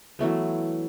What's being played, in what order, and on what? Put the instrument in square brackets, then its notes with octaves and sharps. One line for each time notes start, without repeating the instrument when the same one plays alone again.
[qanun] E3 F#3 A3 B3